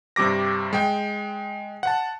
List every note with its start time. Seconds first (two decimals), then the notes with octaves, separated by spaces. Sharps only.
0.16 G2 C3 G3 D6 A#6
0.73 G#3 G5
1.83 F#5 A5